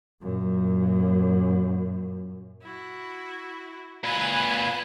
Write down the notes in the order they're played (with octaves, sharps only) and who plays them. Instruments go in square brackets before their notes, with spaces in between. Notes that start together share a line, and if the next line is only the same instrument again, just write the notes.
[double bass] F#2 A#2
[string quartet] E4 F#4
[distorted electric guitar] A#2 B4 [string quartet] G#5 B5 F#6